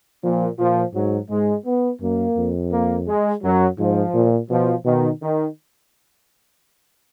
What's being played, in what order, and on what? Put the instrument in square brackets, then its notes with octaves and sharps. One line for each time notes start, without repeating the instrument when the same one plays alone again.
[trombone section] A#2 [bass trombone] F3
[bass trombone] A#2 [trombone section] F3
[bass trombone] G#2 [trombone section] F#3
[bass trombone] G#2 [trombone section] G#3
[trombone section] B3
[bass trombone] F#2 [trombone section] A#3
[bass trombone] F2
[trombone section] A#3
G#3
[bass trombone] F#2 [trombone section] F#3
[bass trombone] G#2 [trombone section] F3
[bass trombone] A#2
[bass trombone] B2 [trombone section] F3
[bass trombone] B2 [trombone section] D#3
[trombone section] D#3